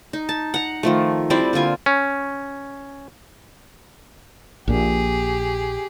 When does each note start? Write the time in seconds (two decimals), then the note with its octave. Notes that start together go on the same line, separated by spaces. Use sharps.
0.13 D#4
0.29 A5
0.54 F#5 A#5
0.83 D#3 F3 A3
1.30 G3 C4 E4 D5
1.53 D3 A#3 F4 G#5
1.86 C#4
4.68 A#1 A#2 G4 G#4